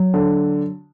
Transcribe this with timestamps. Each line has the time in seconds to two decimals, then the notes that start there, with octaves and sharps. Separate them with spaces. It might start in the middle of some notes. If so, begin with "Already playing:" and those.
Already playing: F#3
0.14 D3